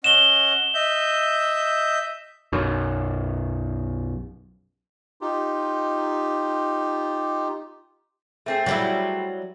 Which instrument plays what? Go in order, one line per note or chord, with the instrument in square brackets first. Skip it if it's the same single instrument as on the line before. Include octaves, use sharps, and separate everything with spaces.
[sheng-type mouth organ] C#4 D#5 F#5 [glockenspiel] E7 G7
[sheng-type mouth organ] D#5 E5 G6
[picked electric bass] B1 F#2
[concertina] D#4 F4 G4
[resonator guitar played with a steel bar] A3 C4 G#4
[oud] F#3 G3 E4